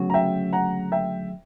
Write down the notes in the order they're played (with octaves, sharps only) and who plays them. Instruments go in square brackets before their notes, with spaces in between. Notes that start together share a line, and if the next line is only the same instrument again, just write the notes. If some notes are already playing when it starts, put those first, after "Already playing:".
Already playing: [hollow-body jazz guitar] D2 C#3 F#3 B3 F#4
[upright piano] A#5
E5 G5
F#5 A#5
E5 G5